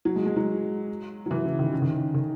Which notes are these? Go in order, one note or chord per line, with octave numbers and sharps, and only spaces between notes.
F#3
G#3
G#3
F#3
F#3
E3
C#3
D#3
C#3
D#3
C#3
D#3